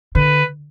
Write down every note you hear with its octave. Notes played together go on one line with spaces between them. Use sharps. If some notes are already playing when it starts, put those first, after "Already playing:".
D3 B4